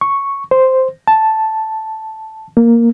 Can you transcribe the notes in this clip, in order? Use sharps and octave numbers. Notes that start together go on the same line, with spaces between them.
C#6
C5
A5
A#3